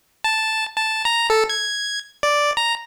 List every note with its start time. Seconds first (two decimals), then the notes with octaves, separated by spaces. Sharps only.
0.24 A5
0.77 A5
1.05 A#5
1.30 A4
1.49 G#6
2.23 D5
2.57 A#5